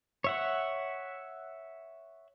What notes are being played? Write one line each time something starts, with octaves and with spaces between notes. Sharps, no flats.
C#5 E5 F#5